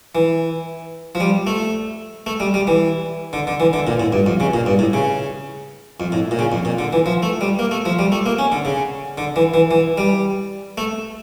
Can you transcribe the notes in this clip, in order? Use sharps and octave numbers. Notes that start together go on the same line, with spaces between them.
E3
F3
G3
A3
A3
G3
G3
E3
D3
D3
E3
D3
A#2
A2
G2
F2
C#3
A#2
G2
A2
C#3
F2
A2
A#2
C#3
F2
A#2
D3
E3
F3
A3
G3
A#3
A3
F3
G3
A3
A#3
C#4
D3
C#3
D3
E3
E3
E3
G3
A3